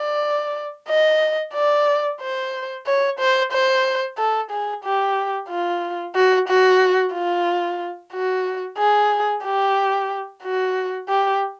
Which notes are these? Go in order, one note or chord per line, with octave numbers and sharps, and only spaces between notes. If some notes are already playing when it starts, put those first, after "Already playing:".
Already playing: D5
D#5
D5
C5
C#5
C5
C5
A4
G#4
G4
F4
F#4
F#4
F4
F#4
G#4
G4
F#4
G4